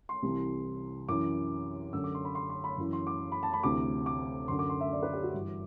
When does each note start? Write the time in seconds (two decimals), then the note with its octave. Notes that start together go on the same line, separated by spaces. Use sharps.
0.09 C6
0.22 C2 C3 E3
1.08 F#2 E3 D6
1.93 F#2 D3 E6
2.04 D6
2.15 C6
2.25 B5
2.35 C6
2.50 C6
2.64 B5
2.78 F#2 E3
2.93 C6
3.07 D6
3.32 B5
3.43 A5
3.53 B5
3.63 D2 C3 E3 D6
4.06 D6
4.48 F#2 D3 C6
4.59 D6
4.69 C6
4.81 E5
4.92 D5
5.02 B4
5.13 G4
5.23 F#4
5.34 G2 E3